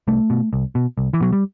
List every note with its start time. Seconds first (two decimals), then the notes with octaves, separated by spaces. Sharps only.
0.08 C2 A3
0.30 B2
0.53 C2
0.75 B2
0.98 C2
1.14 E3
1.20 B2 F#3
1.33 G3